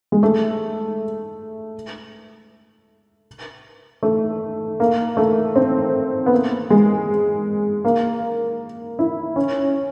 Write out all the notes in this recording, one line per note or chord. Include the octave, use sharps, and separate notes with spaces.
G#3
A3
A3
A#3
A3
C4
B3
A#3
G#3
A#3
E4
C#4